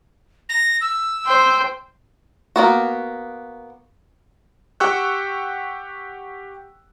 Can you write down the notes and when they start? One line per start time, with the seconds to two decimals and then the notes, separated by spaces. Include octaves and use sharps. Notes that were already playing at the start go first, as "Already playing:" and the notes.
0.49 A#6
0.81 E6
1.26 C5 G5
2.56 A#3 B3 F#4
4.80 G4 F#5 G5 C#6 E6 F#6